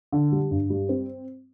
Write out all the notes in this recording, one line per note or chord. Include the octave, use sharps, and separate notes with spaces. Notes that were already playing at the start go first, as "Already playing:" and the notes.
D3
G3
G2
G3
C4